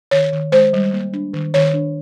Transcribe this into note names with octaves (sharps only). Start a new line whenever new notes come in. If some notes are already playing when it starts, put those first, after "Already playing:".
D#3 C#5
D#3
G#3 C5
G3
A#3
D4
D#3
D#3 C#5
D4